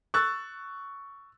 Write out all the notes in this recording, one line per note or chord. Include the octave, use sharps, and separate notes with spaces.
C#6 E6 F#6 A6